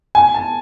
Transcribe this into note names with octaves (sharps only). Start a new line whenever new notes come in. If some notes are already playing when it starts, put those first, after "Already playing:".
G#5
A5